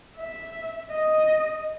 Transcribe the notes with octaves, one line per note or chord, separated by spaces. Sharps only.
E5
D#5